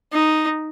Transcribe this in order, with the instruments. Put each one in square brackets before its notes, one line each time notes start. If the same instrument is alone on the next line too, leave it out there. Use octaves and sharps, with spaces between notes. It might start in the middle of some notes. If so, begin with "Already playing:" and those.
[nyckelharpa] D#4